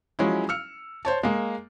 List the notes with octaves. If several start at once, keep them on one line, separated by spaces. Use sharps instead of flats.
F3 F#3 G#3 C#4 E4
E6 F6 C#7
C5 C#5 A5
G#3 A#3